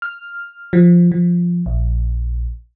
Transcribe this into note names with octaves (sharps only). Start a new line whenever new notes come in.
F6
F3
F3
A#1